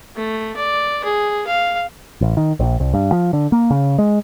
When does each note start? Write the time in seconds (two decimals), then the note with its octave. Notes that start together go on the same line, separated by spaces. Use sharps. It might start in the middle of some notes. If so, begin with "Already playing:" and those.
0.16 A3
0.56 D5
1.04 G#4
1.47 F5
2.21 A1
2.37 D#3
2.59 A#1
2.80 C2
2.94 G2
3.12 F3
3.33 D3
3.52 A#3
3.71 C#3
3.98 G#3